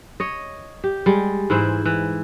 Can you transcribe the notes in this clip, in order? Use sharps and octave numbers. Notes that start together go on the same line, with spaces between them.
C#5 D#5
G4
G3 G#3
G#2 E3 E4 C5
E3